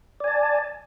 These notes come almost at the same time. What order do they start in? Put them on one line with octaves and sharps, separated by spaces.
D5 G#5 A5